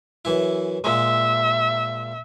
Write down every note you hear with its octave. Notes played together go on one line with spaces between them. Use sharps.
F#2 E3 E4
A#2 G#3 E5